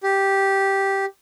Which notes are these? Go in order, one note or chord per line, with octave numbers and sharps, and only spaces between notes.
G4